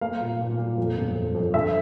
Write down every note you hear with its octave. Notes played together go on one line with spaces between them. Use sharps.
A#3 F5
A#2
A#2
A#2
F2
G1
F2
F2
D2 E5